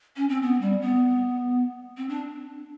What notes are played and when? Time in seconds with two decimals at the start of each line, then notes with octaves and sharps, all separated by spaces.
0.16 C#4
0.29 C4
0.43 B3
0.61 G3
0.81 B3
1.97 C4
2.09 D4